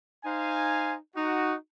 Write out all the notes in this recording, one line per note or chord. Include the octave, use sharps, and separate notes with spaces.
D#4 C5 F5 G#5
D#4 F#4